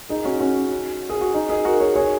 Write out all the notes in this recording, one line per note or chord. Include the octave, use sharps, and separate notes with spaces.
D#4 G#4
C#4 F#4
C#4 F#4
G#4
F#4
D#4
D#4 G#4
F#4 A#4
G#4 C#5
G#4 C#5